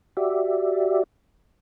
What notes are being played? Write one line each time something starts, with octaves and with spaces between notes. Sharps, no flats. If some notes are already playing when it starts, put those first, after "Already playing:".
F#4 G4 D5 E5